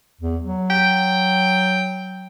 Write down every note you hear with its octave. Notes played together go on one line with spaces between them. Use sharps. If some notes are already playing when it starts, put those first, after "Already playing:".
E2
F#3
G5